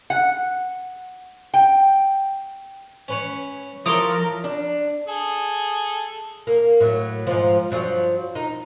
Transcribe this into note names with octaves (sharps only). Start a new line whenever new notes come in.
F#5
G5
C#4 B4 C#5
F3 E4 A4 A#4 C#5 C6 D6 D#6
D4
G#4 A4
A#3
A2 F#3
G#2 F3
G2 F3 F#3
D#4